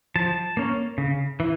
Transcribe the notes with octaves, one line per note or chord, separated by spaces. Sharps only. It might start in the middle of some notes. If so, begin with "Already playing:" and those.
F3 A5
A#3 C#4
C#3
E3